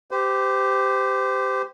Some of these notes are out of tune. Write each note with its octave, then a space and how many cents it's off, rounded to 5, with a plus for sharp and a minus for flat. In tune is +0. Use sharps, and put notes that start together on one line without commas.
G4 +0 C5 -30